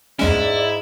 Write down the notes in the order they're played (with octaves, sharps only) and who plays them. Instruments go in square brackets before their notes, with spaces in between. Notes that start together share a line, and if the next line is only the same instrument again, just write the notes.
[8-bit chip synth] E2 G#3 C#4 [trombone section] G#2 [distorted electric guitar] E4 [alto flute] D5